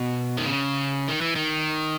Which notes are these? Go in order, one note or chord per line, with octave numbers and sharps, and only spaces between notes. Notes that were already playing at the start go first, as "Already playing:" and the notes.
Already playing: B2
D#3
C#3
D#3
E3
D#3